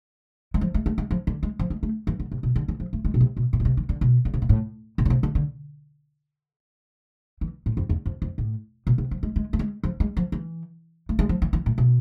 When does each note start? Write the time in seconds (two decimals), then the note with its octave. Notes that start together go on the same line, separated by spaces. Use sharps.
0.54 G#3
0.61 F3
0.74 G#3
0.86 A3
0.98 G#3
1.11 F3
1.27 D3
1.43 G#3
1.59 F3
1.70 G#3
1.83 A3
2.07 E3
2.20 D3
2.32 C3
2.43 B2
2.56 D3
2.68 E3
2.80 F3
2.93 A3
3.05 G#3
3.14 B2
3.21 C3
3.37 B2
3.53 A2
3.60 B2
3.65 C3
3.77 E3
3.89 D3
4.01 B2
4.25 D3
4.34 C3
4.42 B2
4.49 A2
4.98 B2
5.05 D3
5.10 C3
5.23 D3
5.35 D3
7.41 E3
7.66 A2
7.77 F2
7.89 E2
8.06 F2
8.22 F2
8.38 A2
8.87 B2
8.98 C3
9.11 F3
9.23 G#3
9.36 G#3
9.53 A3
9.59 G#3
9.83 F3
10.00 G#3
10.17 F3
10.32 E3
11.09 A3
11.19 G#3
11.29 F3
11.42 E3
11.53 E3
11.66 A2
11.78 B2